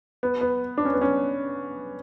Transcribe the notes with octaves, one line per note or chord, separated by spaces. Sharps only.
B3
B3
D4
C#4
B3
C#4